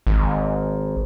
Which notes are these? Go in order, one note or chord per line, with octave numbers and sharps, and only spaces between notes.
G#1